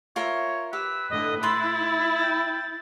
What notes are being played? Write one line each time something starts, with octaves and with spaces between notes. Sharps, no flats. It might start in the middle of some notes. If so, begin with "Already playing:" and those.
F4 A#4 C#5 E5
G4 B4 E6
A2 D3 D#5
E4 B5 C6 A6
G5